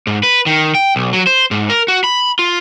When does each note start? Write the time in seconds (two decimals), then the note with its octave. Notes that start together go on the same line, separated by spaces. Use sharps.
0.07 G#2
0.23 B4
0.46 D#3
0.75 G5
0.96 B1
1.13 F#3
1.27 C5
1.51 G#2
1.70 A#4
1.88 F#4
2.04 B5
2.39 F4